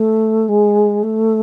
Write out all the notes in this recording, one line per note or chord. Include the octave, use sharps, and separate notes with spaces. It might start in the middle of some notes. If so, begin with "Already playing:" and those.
Already playing: A3
G#3
A3